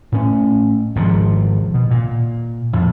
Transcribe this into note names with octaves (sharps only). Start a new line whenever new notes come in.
A2 C#4
G#1 C3 D#3 F3
B2
A#2
F2 A2